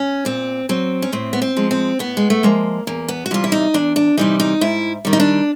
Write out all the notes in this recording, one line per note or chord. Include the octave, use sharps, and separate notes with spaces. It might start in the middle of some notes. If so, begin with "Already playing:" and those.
Already playing: C#4
A#2 C4
F#3 C4
C#4
A2 C4
B3
C4
F3 G#3
C4
A2 B3
G#3
A3
F3 G#3 A#3
E2 A#3
B3
F#4
C3 E3 G3 F4
E4
D#4
E2 D4
D4
C3 E3 G3 D#4
D#4
G#2 E4
D#3 G3
D#4
D4